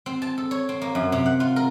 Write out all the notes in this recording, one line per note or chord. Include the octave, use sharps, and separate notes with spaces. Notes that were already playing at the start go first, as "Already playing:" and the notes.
C4
A5
A4
C#5
C4
A#3
F#2
C3
F#5
F4
A#4